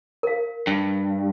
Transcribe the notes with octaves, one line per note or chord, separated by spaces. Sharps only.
A#4 F5
G2